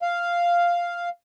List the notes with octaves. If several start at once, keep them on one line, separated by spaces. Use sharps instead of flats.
F5